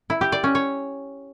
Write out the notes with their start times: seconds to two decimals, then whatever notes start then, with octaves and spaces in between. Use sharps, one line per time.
0.10 E4
0.21 G4
0.32 D5
0.44 C#4
0.55 C#5